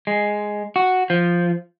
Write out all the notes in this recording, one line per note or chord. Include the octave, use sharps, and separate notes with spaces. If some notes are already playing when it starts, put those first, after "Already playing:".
G#3
F#4
F3